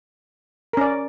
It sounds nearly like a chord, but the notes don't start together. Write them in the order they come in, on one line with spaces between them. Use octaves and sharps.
A#4 C#4 D5